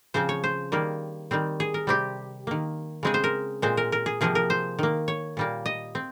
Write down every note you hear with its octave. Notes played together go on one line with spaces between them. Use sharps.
C#3 F3 C4 C5
C#5
C5
D#3 G3 A#3
D#3 G3 C4
G#4
A#4
C3 G3 C4 G4
D#3 A#3
C#3 G#3 C4 G#4
C5
A#4
A#2 G#3 C4 C5
A#4
A#4
G#4
C3 F3 A#3 G#4
A#4
C5
D#3 A#3
C#5
A#2 G3 A#3
D#5
C4